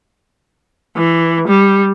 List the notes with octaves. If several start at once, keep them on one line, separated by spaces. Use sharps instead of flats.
E3
G3